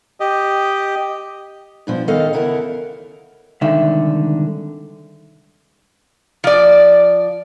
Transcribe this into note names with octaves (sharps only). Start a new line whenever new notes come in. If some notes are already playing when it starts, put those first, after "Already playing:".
G4 D#5
G2 B2 F3
D#3 B3 A4 D#5 F5
E2 C#3 E4 A#4 F#5
C2 G#2 D3 D#3 E5
F3 D5